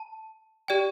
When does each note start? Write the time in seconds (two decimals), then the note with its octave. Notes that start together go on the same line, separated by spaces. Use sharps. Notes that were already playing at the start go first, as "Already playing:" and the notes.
Already playing: A5
0.68 G4 D5 G5